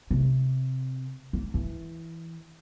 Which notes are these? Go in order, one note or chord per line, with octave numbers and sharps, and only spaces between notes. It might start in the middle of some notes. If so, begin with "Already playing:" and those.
C3
A#3
E3